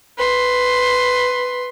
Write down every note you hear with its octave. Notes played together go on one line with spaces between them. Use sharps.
B4 C6